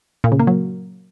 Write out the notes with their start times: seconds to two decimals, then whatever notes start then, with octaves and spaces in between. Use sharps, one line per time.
0.24 A#2
0.32 C#3
0.40 A#3
0.47 F#3